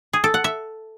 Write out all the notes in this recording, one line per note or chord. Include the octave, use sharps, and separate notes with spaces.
G#4
A4
F#5
E5